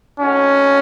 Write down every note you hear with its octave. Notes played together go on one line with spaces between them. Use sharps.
A3 C4 C#4 D#4 F#4